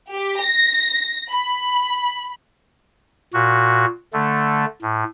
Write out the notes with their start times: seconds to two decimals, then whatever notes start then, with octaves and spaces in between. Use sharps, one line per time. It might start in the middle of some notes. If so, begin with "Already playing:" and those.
0.11 G4
0.42 A#6
1.30 B5
3.34 A#2 F#4
4.13 D3 A3
4.82 A2